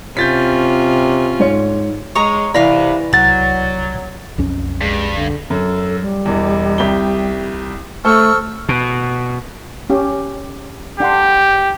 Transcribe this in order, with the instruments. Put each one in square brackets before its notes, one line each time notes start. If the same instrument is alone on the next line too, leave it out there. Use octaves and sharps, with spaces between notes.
[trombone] C3 [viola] C#4 F4 [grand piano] G6 A6 B6
[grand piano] G#2 C#5 C#7
[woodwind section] G#3 [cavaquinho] C#5 D#5 A#5
[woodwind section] C3 [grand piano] E3 D5 A#6 [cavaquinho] B4 F5 B5
[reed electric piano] C2 A6 [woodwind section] F#3 [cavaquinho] F#5
[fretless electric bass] B1 F2 C#4
[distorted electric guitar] G2 [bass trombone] G#3
[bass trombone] D3
[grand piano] F#2 [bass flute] A4
[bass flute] G3
[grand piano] E1 E2
C2 G4 G7
[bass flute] A3 [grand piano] A4 C5 [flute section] C#6 E6 F6
[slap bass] B2
[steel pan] C#4 G4
[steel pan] D4 F#5 C6 [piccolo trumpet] G4